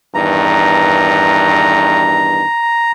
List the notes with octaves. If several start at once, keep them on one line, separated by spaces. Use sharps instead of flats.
E2 G2 D#3 A#5